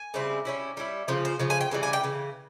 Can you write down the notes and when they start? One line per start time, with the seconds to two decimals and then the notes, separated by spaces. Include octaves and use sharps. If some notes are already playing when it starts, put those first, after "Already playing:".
Already playing: G#5
0.14 C#3 G3 C4 E4
0.45 G3 C#4 E4
0.77 G3 C#4 E4
1.08 C#3 F3
1.25 C5
1.39 C#3 F3
1.50 G#5
1.61 G5
1.71 C#3 E3 G3
1.83 G#5
1.93 G5
2.03 C#3 E3